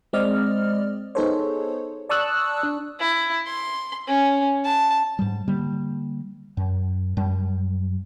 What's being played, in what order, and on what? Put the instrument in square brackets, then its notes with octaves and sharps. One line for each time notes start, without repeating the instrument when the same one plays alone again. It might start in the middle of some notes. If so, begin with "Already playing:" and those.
[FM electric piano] G#3 C4 D5 D#5 F6
B3 D#4 G#4 A4 C5 C#5
D5 A5 C#6 D#6 E6 F#6
D4
[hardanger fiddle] E4
C6
C#4
A5
[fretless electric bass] G#2 G3
D3 G3 A#3
F#2
F#2 G3